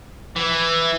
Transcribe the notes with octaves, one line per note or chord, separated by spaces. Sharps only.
E3